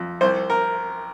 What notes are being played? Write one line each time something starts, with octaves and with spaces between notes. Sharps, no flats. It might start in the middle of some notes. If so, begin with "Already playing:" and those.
Already playing: F2
C2 C5
A#4